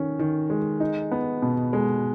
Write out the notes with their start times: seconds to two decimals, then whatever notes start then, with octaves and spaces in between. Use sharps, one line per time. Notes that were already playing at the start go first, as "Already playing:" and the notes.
Already playing: D#3 C#4
0.19 D#3
0.50 G#3
0.80 D#4
1.12 B3
1.42 B2
1.73 G#3